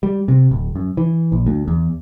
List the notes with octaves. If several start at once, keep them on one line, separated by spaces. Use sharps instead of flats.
G3
C3
D1
F#2
E3
A#1
D2
E2